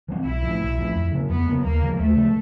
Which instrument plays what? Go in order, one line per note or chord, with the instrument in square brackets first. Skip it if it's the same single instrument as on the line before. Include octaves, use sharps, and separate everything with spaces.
[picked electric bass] E3 G3 C4
[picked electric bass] B1 [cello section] E4
[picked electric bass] A2 F3
B1
A2 F3
F2
C#3 F#3 A#3
[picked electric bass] F2 [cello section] B3
[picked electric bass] C#3 F#3 A#3
[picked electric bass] D#2 [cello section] A#3
[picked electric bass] C#3 F3 G#3
[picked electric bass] D#2 [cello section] A3
[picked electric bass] C#3 F3 G#3